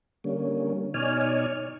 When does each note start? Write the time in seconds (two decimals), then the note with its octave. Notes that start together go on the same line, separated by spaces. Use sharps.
0.24 D3 G3 A#3 C#4
0.94 B2 D#4 C#5 D5 G#5 F6